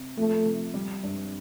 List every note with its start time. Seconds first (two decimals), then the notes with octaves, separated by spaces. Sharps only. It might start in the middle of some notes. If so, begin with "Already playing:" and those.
Already playing: C3
0.18 F3 A3
0.46 C3
0.74 G3
1.03 G2